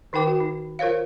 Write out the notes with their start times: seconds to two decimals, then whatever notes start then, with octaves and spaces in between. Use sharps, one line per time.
0.13 D#3 D#4 A#4 G5 D6
0.27 F#4
0.40 D#4
0.79 F4 A#4 C5 C#5 F5